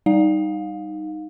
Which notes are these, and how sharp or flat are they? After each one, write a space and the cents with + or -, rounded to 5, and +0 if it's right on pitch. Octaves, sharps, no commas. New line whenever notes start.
G3 +0 D#4 +0 F5 +25